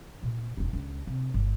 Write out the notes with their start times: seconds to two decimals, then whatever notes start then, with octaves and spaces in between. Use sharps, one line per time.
0.23 A#2
0.57 E1 D#4
0.73 C#2 D4
1.07 C3
1.34 G1